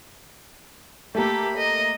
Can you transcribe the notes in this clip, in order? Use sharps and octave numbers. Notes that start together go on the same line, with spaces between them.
A3 A#3 G4 A4 B5
D#5